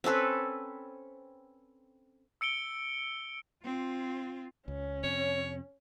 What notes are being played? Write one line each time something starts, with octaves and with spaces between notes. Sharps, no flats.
C4 C#4 A4 B4
E6 C#7 D7 G7
C4 F4
C#2 C#4
F2 C3 C#5